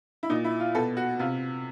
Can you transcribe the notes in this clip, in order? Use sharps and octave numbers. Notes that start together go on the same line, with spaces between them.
E4
A#2 D#4
E4
F4
B2 A4
F#4
C3 F4